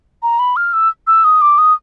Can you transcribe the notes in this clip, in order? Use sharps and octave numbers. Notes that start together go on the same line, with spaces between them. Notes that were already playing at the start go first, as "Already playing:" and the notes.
A#5
B5
F6
E6
E6
D#6
D6
D#6